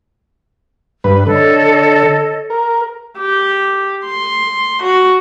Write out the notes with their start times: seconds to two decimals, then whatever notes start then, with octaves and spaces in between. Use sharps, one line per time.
1.04 G2 B4
1.27 D3 A4 C#5 D#5
2.50 A#4
3.18 G4
4.05 C6
4.83 F#4